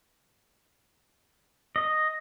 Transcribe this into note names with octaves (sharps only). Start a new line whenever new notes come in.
D#5